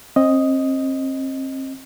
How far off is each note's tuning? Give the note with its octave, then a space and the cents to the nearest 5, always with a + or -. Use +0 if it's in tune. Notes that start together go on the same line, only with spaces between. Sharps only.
C4 +35 D#5 +0